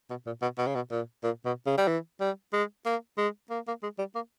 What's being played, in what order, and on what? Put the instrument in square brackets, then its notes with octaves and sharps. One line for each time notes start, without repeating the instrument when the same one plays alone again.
[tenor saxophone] B2
A#2
B2
B2
C#3
B2
A#2
A#2
B2
C#3
G3
E3
G3
G#3
A#3
G#3
A#3
A#3
G#3
G3
A#3